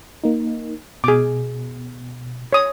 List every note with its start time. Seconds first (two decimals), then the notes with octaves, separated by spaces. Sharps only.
0.24 A#3 D#4
1.04 B2 G#4 D6
2.53 C#5 D#6